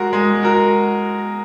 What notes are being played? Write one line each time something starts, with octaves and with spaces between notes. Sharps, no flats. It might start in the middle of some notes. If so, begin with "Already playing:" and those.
Already playing: G#3 F#4 A#4
G#3
F#4 A#4